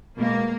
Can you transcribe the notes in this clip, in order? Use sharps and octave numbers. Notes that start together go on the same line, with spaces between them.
B2 G#3 A#3